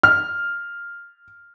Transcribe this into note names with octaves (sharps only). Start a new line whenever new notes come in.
F6